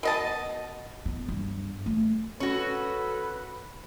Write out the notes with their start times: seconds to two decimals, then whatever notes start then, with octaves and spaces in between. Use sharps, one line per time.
0.03 B2 D#5 A5
1.06 B3
1.29 G2
1.86 A3
2.40 C#4 F#4 A4 B4